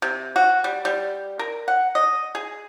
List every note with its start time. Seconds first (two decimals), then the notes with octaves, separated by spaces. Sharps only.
0.02 C3
0.36 F#4
0.64 G3
0.85 G3
1.39 A#4
1.68 F#5
1.95 D#5
2.35 G#4